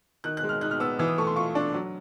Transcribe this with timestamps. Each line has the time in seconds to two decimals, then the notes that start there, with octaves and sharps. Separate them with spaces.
0.24 D#3 F#6
0.37 F#6
0.43 G#3
0.49 F6
0.61 D#4 F#6
0.71 F6
0.80 B3 E6
0.99 E3 E6
1.08 D#6
1.18 A3 C#6
1.27 C6
1.36 F4 C#6
1.55 D4
1.74 F#3